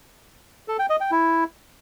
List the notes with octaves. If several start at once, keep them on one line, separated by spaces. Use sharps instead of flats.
A4
G5
D#5
G5
E4